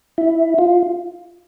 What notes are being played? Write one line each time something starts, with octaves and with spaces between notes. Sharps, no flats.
E4
F4